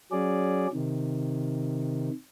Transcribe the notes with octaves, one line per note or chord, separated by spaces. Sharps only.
F#3 C#4 G#4 D5
C3 D#3